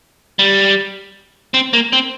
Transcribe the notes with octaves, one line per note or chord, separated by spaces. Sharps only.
G3
C4
A#3
C4